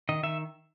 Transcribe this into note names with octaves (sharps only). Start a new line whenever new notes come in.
D#3 D#5
D#3 E5